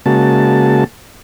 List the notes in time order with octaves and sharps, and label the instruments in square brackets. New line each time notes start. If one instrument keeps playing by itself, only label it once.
[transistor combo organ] C#3 G#3 A#3 F#4 A5